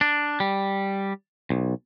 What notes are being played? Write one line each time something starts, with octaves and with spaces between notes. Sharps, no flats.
D4
G3
B1